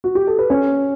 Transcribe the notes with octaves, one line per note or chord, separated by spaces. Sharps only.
F#4
G4
A4
B4
C#4 C#5